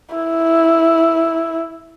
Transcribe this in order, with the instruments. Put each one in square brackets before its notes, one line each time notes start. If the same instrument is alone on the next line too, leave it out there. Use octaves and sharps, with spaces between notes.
[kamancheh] E4